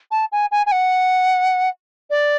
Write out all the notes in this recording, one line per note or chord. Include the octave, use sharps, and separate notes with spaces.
A5
G#5
G#5
G#5
F#5
D5